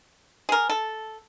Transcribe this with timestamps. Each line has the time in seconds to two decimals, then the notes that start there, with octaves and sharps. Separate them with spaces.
0.49 G#4 A#4
0.70 A4